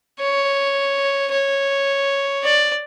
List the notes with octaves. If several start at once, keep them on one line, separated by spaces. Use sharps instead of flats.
C#5
C#5
D5